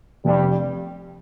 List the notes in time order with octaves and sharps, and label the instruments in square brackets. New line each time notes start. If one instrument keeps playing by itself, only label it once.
[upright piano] F1 [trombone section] G2 G3